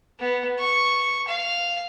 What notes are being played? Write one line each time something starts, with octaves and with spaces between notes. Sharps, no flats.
B3
C#6
F5